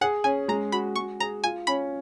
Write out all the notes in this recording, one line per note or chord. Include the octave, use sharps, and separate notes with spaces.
G#4 F#5
C#4 G#5
G#3 A#5
F#4 B5
G#3 C#6
G#4 A#5
F4 G#5
C#4 B5